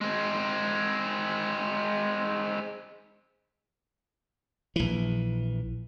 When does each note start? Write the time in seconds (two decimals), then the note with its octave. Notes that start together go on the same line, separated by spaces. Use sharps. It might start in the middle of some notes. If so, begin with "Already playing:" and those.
0.01 G#3 C4
4.76 A#1 E3